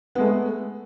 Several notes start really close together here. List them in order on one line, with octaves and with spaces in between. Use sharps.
B3 G#3 A3